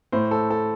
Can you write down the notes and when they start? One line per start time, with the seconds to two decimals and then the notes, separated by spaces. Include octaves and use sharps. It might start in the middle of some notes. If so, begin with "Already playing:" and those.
0.12 A2 C5
0.31 A4
0.50 A4